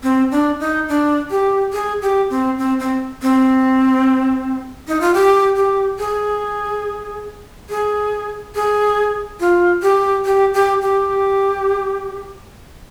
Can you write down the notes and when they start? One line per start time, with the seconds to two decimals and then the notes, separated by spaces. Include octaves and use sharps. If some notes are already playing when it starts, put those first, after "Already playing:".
0.03 C4
0.31 D4
0.60 D#4
0.88 D4
1.30 G4
1.73 G#4
2.02 G4
2.30 C4
2.58 C4
2.79 C4
3.22 C4
4.88 D#4
5.01 F4
5.14 G4
5.56 G4
5.99 G#4
7.70 G#4
8.55 G#4
9.40 F4
9.82 G4
10.25 G4
10.54 G4
10.82 G4